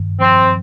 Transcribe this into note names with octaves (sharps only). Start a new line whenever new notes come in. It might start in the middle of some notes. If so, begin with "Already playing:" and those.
Already playing: G2 D#3
F3 C4